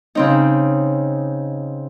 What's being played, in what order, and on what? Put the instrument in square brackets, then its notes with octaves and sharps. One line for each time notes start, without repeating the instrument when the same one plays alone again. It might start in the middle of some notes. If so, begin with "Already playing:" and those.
[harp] C#3 C4 D#4